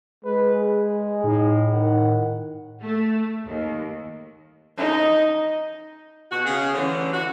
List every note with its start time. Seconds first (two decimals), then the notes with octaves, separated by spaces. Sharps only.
0.25 G#3 B4
0.54 G#4
1.24 A2 D#4
1.73 D#3 F#5
2.82 A3
3.48 D#2
4.77 D#4 D#5
6.31 B2 F#4
6.45 C#3 G#4
6.74 D3 E3 G3 A3 C#4
7.14 F#4